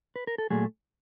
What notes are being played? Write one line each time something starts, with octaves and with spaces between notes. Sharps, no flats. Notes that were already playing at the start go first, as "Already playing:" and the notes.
B4
A#4
A4
A#2 F#3 A3 G#4